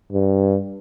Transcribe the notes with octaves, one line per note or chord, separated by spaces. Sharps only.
G2